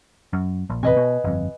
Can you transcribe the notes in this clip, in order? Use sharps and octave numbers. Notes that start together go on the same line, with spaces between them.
F#2
A#1
D#1 A1 C3 B4 D#5 G#5
B2
G1 F2